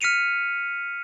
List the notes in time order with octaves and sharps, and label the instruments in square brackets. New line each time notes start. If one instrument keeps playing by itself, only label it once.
[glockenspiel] F6 B6 C#7 D#7 F7